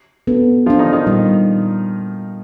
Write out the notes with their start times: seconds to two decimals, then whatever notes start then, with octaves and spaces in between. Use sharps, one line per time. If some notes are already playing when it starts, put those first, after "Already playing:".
0.27 B3 D4 F#4 A4
0.66 F3 F#3 B3 D4 F4
0.79 D#3 D#4
0.93 D#3 D#4
1.06 A#2 G3 B3 D4